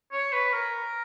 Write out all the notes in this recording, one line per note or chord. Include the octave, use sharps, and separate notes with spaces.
C#5
B4
A#4